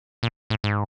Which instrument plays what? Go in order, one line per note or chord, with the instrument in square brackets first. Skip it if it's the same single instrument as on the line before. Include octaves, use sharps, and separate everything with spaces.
[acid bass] A#2
A2
G#2